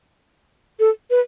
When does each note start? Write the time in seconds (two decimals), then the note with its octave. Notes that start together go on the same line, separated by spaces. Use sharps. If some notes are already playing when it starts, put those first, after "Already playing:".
0.80 A4
1.10 B4